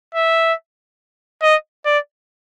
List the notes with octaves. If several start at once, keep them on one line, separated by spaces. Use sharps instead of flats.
E5
D#5
D5